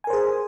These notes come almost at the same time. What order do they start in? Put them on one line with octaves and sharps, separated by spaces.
G#5 A#4 C5 G#4